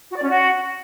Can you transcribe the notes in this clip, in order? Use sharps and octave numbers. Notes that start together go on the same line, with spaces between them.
F#4
D5
C#4
F#4